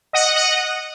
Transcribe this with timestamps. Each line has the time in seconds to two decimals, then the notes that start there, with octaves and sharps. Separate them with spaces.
0.13 D#5 F#5
0.36 D#5 F#5